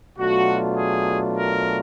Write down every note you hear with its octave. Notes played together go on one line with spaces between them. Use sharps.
B2 F#3 A3 D4 F4 F#4
G#4
A#4